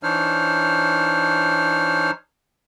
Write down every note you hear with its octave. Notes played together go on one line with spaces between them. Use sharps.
E3 D4 D#4 C5 C#5 F6